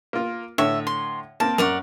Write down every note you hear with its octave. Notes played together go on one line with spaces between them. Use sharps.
A#3 F4
A2 D3 C#5 E5
C6
A#3 C4 A5
F#2 A#4 D5 F#5 C#6